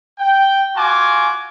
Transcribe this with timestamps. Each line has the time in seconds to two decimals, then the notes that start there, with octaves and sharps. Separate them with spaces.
0.19 G5
0.76 F4 F#4 G#5 D6